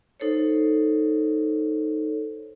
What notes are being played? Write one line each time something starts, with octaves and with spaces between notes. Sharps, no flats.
D#4 A4 C5 C#5